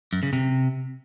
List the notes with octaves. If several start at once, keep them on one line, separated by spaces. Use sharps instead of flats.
F#2
C#3
C3